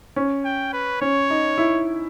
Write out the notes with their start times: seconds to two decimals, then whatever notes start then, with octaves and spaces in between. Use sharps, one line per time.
0.16 C#4
0.45 G5
0.73 B4
1.01 C#4 C#5
1.30 D#4
1.58 E4